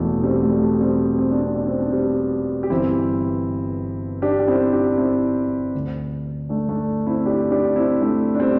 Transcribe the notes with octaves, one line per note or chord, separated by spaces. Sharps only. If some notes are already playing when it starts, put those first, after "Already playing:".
Already playing: E1 E2 C3 E3 A3
G3 C4
A3
G3
A3
G3 C4
C4
D4
C4
D4
C4
D4
G3 C4
G4
G1 G2 E3 C4 E4
D4 G4
G4
C4 E4
D4 G4
C4 E4
D2 D3
A3 D4
A3 D4
C4 E4
D4 G4
D4 G4
C4 E4
A3 D4
D4
G3 C4